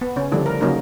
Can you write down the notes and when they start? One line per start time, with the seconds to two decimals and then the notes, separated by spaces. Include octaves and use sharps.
0.01 B3
0.16 C#3 C#4
0.32 D3 F3 G3 A3 D4 E4
0.46 A#4
0.60 C#3 F#3 A#3 C#4 D#4 A#4